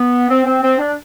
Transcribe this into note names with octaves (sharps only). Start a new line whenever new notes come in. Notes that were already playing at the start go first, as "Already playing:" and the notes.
Already playing: B3
C4
C4
C4
D4